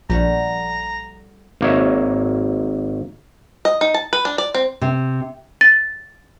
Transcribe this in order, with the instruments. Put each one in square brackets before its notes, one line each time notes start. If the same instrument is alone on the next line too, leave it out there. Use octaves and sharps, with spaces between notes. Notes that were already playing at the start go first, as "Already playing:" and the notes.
[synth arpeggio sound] A#1 [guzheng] G3 A3 F#4 [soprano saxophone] A#5
[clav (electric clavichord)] G#1 A#3 A#4 C#5 E5
[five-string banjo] D#5
D#4
A5
B4
D4
D5
C4
[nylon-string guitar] C3
[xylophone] A6